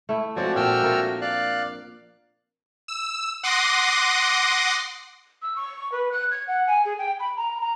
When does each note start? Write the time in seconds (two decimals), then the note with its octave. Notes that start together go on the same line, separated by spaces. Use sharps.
0.09 A3 E4
0.36 F3 G#3 A3 C4 F#4 C#5 D5
0.56 A#2 D4 G5 E6 F6
0.83 F4 A#4
1.21 D5 F5 F#6
2.88 E6
3.43 F#5 C6 D6 D#6 A#6 C7
5.42 E6
5.56 C#6
5.92 B4
6.12 F#6
6.31 G#6
6.47 F#5
6.67 G#5
6.85 G#4
6.99 G5
7.20 B5
7.37 A#5
7.61 A#5